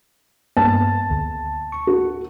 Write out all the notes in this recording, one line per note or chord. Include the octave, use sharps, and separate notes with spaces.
G2 A#3 B3 A5
D2
C#6
F#4